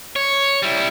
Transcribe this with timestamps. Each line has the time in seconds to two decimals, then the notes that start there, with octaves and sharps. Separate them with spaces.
0.16 C#5
0.63 G3 E4